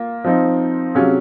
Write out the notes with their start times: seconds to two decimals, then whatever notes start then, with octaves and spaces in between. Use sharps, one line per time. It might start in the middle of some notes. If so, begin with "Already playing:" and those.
Already playing: A#3 F4
0.24 F3 C4 D#4
0.95 C3 F#3 C#4 F4 G#4